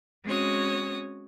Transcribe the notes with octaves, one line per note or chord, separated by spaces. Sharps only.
G#3 C4 C#4 F#4 C#5 D#6